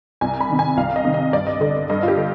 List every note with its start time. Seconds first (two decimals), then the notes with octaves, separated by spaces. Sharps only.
0.21 C2 G#5
0.40 B5
0.50 C3 D#3
0.59 G#5
0.77 C2 F5
0.96 D#5
1.05 C3 D#3
1.14 D#5
1.33 G2 D5
1.47 D#5
1.61 D3 D#5
1.90 G2 D#5
2.03 F4
2.08 G4
2.17 D3